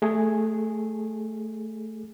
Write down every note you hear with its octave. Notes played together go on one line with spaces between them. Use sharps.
A3 G#4 A4